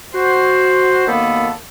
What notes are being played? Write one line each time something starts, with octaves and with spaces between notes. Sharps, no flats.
F#4 C5
F#2 D#3 A#3 B3 A4 B5